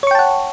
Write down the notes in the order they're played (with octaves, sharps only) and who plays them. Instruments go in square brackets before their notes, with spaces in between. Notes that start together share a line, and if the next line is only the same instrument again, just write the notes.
[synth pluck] C#5
C#6
G5
A5
F#5